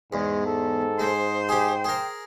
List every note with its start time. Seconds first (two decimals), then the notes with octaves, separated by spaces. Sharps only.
0.13 E2 G#2 G#3
0.46 A4
0.99 G#3 C5
1.49 G4 G#4 G5
1.84 G#4 A#4